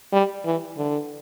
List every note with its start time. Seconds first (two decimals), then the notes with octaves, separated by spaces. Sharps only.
0.12 G3
0.45 E3
0.77 D3